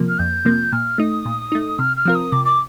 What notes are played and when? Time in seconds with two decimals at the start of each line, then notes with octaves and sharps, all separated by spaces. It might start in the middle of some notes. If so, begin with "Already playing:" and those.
Already playing: C3 F3 A#3
0.08 F6
0.19 F2 G6
0.45 C3 F3 A#3
0.72 A#2 F6
0.98 A3 D#4 D#6
1.25 A#2
1.52 A3 D#4
1.79 C3 F6
1.96 F6
2.05 F3 C4 F4 A#4
2.15 D#6
2.32 C3 D6
2.45 D6